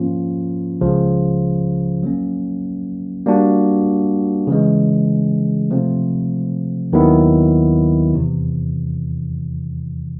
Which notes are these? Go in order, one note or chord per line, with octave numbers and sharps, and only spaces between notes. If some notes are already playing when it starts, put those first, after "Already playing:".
Already playing: G#2 F3 A#3 C#4 F4
C#2 C#3 F3
F#3 A#3 C#4
G3 A#3 D4 F#4
C#3 E3 G#3
C3 F3 A3 C4
D#2 D#3 F#3 B3 E4
E2 C3 E3